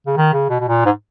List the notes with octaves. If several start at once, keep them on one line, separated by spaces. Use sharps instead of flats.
C#3
D#3
C#3
B2
B2
A#2
G#2